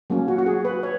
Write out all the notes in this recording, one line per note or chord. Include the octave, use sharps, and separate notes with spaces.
F#3 A#3 C#4
F#4
F#4
G#4
B4
C#5